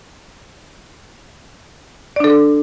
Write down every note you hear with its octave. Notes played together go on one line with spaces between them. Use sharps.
D4 A4 D5